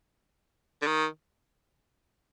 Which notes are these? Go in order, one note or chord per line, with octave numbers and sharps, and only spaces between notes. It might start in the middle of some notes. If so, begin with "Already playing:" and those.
D3
D#3